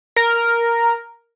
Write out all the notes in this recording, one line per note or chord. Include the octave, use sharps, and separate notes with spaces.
A#4